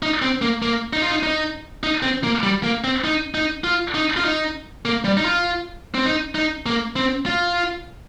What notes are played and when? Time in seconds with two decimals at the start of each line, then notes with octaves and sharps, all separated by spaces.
0.03 D#4
0.22 C4
0.42 A#3
0.62 A#3
0.93 D#4
1.02 F4
1.10 D#4
1.23 D#4
1.83 D#4
2.03 C4
2.24 A#3
2.43 G3
2.63 A#3
2.84 C4
3.04 D#4
3.35 D#4
3.64 F4
3.94 D#4
4.17 F4
4.24 D#4
4.85 A#3
5.04 G3
5.17 D#4
5.25 F4
5.95 C4
6.05 D#4
6.35 D#4
6.66 A#3
6.96 C4
7.26 F4